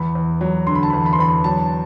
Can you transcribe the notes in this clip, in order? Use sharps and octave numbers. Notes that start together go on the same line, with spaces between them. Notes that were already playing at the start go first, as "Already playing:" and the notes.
Already playing: E2 B5
E2
F#3
D3 C6
B5
A5
E2 B5
B5
C6
E2 B5
F#3 A5